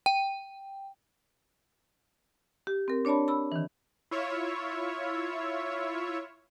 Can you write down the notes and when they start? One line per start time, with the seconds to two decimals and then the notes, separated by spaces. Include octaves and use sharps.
0.06 G5
2.67 G4
2.88 C4 A#4
3.05 D4 C#5 D5 A5 B5
3.28 B5 E6
3.52 D#3 E3
4.11 E4 F4 C#5 E5